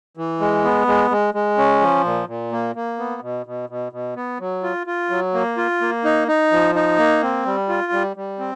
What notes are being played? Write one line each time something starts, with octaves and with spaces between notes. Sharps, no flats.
E3
G#3
B3
G#3
G#3
G#3
C#4
F3
A#2
A#2
A#3
A#3
B3
B2
B2
B2
B2
B3
F#3
F4
F4
F#3
A#3
F4
A#3
D#4
D#4
F3
D#4
A#3
C4
G3
F4
G3
G3
C4